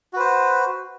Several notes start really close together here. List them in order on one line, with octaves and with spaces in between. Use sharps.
F#4 B4 C5